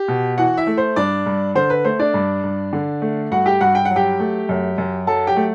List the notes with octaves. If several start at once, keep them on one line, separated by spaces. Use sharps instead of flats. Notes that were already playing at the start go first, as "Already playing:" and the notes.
Already playing: G4
B2
E3 F#4 F#5
E4 E5
A3
C5
G2 D4 D5
G2
D3 C5
B4
A3 C5
D4 D5
G2
G2
D3
A3
G2 F#4 F#5
G4 G5
G2 F#4 F#5
G5
F#5
F#3
G4 G5
A3
F#2
F#2
F#3 A4 A5
G4 G5
A3